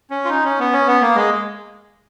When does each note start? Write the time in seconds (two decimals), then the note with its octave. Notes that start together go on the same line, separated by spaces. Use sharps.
0.11 C#4
0.25 F4
0.29 D#4
0.44 C#4
0.59 B3
0.73 C#4
0.87 B3
1.01 A#3
1.15 G#3